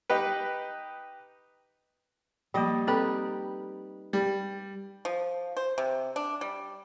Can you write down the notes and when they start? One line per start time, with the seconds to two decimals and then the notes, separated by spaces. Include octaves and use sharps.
0.10 D#4 G4 B4
2.54 F3 G3 A#3 D5 D#5
2.87 C4 D#4 G4 A4 B4
4.13 G3
5.05 F3
5.57 C5
5.78 C3
6.16 D4
6.41 G3